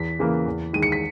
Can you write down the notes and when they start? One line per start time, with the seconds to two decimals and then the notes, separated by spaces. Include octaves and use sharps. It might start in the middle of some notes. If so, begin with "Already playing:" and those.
Already playing: E2 B6
0.19 C#3 E3 A#3
0.46 E2
0.73 D#3 G#3 D#7
0.83 C#7
0.92 B6